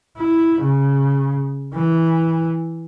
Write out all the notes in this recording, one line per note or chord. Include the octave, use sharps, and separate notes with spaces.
E4
C#3
E3